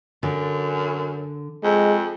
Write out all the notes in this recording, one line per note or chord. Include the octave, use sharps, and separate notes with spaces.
F#2 D3
F2 G#3